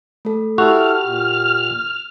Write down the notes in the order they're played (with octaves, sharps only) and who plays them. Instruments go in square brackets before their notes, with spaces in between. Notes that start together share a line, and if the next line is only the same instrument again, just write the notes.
[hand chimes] A3 A4
[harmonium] E4 A4 [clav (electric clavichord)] F#4 [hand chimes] G4 [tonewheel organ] F6
[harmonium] A#2